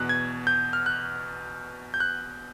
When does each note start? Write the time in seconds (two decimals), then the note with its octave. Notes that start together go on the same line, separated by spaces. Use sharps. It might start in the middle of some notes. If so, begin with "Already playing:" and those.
Already playing: E2 B2 F#6
0.09 G#6
0.47 G6
0.73 F6
0.86 F#6
1.94 G6
2.00 F#6